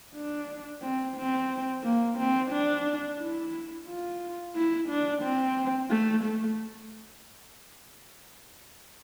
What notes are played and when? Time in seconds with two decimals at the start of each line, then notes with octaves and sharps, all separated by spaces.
0.15 D4
0.82 C4
1.16 C4
1.84 A#3
2.18 C4
2.52 D4
3.20 E4
3.88 F4
4.56 E4
4.89 D4
5.23 C4
5.90 A3
6.24 A3